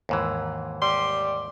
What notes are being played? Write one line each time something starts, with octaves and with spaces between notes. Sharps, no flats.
D#2 G#2 E3
G3 C6